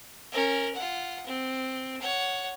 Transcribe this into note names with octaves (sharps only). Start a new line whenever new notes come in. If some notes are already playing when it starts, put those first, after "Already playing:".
C#4 A#4
F4 F#5
C4
C#5 F#5